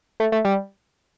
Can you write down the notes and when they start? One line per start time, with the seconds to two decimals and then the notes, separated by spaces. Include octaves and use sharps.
0.20 A3
0.32 A3
0.45 G3